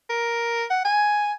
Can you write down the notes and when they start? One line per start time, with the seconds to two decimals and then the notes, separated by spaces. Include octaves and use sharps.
0.10 A#4
0.70 F#5
0.85 G#5